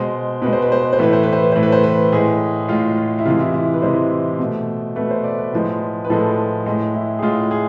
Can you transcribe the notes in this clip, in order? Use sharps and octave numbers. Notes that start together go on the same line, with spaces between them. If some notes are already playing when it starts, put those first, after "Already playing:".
Already playing: B2 G#3 C5
B2 G#3 B4
C5
B4
C5
B4
C5
A2 E3 A3 B4
C5
B4
C5
B4
A2 E3 A3 C5
B4
C5
B4
A2 G#3 G#4
A2 G#3 F4
F4
E4
C3 E3 G#3 F4
E4
E4
B4
C3 E3 G#3 C5
B2 A3
B2 A3 B4
C5
D5
B4
A2 F3 G#3
B4
A2 F3 G#3 A4
A2 G#3
E4
G#4
A2 G#3 F4
G#4